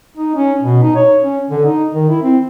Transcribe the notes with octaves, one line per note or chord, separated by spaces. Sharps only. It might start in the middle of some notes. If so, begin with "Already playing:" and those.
D#4
C#4
B2
D#4
C#5
C#4
D3
D#4
D#3
E4
C4